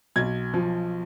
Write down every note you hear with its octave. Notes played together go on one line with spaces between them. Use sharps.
B1 G#6
F3